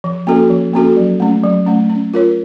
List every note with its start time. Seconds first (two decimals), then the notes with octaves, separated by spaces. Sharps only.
0.04 F3
0.27 A#3 C#4 F#4 A4
0.50 F3
0.73 A#3 C#4 F#4 A4
0.97 F#3
1.20 A3 C#4
1.44 F#3
1.66 A3 C#4
1.90 C#4
2.14 F4 A#4 C#5